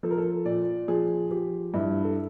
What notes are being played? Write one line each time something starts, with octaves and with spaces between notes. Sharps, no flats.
F3 A4
A#4
A4
A#2 D5
F3 G#4
F3 G4
G2 E4
A4